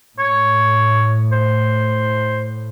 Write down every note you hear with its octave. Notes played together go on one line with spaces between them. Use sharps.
A2 C#5
C5